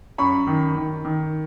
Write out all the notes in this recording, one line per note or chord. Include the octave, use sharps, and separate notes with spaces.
F#2 B5 C#6
D#3
D#3
D#3